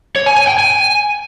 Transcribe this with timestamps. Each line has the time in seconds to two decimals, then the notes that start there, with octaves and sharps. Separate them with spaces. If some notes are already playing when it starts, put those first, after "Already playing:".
0.16 C#5
0.26 G#5
0.37 G#5
0.48 G5
0.59 G#5